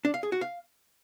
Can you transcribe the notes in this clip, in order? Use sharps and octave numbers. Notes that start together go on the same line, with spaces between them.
D4
F5
G#4
F#4
F5